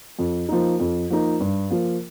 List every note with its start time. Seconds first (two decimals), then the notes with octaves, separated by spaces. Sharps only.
0.19 F2
0.49 F3 A#3 D#4
0.80 F2
1.10 F3 A#3 D#4
1.40 G2
1.70 F3 A#3 F4